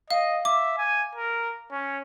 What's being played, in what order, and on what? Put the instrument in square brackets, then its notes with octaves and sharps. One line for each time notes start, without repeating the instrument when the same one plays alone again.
[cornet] D#5 [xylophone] F5
[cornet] E5 [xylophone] D6
[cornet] G#5
A#4
C#4